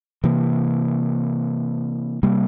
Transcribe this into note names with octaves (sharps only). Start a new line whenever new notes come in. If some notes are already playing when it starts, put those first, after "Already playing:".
C3 E3 A#3
C3 G3 A#3